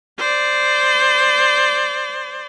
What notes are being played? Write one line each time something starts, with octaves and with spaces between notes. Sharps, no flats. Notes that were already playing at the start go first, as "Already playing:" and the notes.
C5 D5